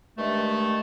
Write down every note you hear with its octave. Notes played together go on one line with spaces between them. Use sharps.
G2 D#3 G#3 A3